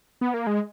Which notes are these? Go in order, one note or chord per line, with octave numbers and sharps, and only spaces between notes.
B3
A#3
G#3